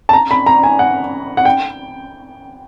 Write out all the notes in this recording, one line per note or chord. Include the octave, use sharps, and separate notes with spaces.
A5
A#5
B5
A#5
G#5
F#5
F#5
G5